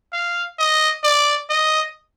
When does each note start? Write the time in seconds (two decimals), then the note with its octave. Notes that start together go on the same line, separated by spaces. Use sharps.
0.13 F5
0.58 D#5
1.04 D5
1.50 D#5